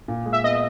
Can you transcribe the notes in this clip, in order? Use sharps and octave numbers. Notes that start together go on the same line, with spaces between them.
A#2
G#3
E5
B3 D#5